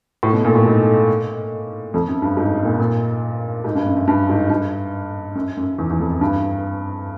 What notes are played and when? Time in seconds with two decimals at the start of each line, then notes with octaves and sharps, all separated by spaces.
0.23 A2
0.33 B2
0.45 A#2
0.55 A2
0.65 G#2
1.94 F2
2.08 F#2
2.22 G2
2.37 G#2
2.65 A#2
2.79 A#2
3.64 G#2
3.75 G2
3.86 F#2
3.97 F#2
4.08 G2
4.29 G#2
4.50 G2
5.35 F#2
5.57 F#2
5.78 E2
5.90 E2
6.00 F2
6.21 G2